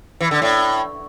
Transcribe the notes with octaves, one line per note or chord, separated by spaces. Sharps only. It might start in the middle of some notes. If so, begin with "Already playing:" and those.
E3
D3
A2